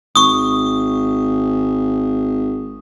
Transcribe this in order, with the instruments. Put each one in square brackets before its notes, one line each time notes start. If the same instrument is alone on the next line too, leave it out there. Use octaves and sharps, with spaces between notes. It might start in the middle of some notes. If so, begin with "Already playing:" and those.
[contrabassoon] G#1 [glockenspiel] C#6 D#6